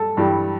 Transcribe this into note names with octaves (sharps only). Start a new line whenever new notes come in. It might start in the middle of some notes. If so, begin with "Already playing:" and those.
Already playing: G2 G3 A4
G2 E3 G3